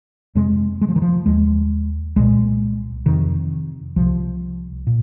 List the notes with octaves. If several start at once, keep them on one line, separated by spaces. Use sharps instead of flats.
F2 C3 G#3
G#3
F3
D#3
F3
D#2 G#3
C2 A#2 G#3
F2 C3 D#3
C2 C3 F3
A#2